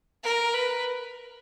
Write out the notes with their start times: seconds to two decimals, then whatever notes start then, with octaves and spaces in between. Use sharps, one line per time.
0.24 A#4
0.54 B4